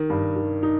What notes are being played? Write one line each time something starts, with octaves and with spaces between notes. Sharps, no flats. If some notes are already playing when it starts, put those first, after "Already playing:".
Already playing: D#3
G2
D#3
D#4